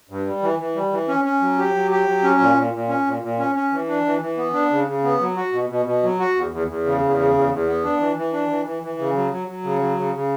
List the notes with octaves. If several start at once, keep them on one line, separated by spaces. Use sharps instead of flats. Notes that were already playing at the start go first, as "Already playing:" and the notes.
G2
G3
E3
E3
G3
E3
C#4
C#4
F#3
G4
F#3
G4
F#3
C#4
A#2
A#2
A#2
C#4
A#2
A#2
C#4
C#4
E3
D4
E3
E3
B3
D4
C#3
C#3
B3
F#3
F#4
B2
B2
B2
F#3
F#4
E2
E2
E2
C#3
E2
C#3
E2
E2
B3
D4
E3
E3
D4
E3
E3
E3
C#3
F#3
F#3
F#3
C#3
F#3
C#3
C#3